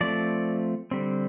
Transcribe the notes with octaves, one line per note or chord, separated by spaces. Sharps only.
F3 A3 C4 D5
D3 G3 C4